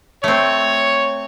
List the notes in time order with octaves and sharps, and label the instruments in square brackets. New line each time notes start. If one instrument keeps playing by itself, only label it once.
[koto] A3 C4 [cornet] C#5